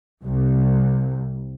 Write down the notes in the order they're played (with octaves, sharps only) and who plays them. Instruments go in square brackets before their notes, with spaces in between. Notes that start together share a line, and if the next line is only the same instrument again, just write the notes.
[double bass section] C2